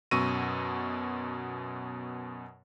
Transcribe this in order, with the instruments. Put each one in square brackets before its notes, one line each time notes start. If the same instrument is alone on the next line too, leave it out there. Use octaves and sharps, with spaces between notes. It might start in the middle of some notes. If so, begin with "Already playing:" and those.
[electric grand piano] F#2 B2 C#6 E6 A#6 D#7